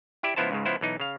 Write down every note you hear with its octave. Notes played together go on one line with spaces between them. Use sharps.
E4 G4 D5 E5
C#2 F3 B3 E4 C5 A5
C#2 G#2 C#3
C#2 F3 B3 E4 C5
B1 E3 D#4
C#3 F5